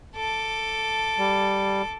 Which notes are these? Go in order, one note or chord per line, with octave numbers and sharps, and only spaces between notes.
A4 D6
G3